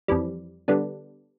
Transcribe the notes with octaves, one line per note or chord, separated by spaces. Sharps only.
F2 E3 G3
D3 G3 B3 D4